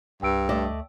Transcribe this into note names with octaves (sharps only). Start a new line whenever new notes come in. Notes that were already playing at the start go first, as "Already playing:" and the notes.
C2 G2 G5 E6 D7
A3 D5 D#5
D2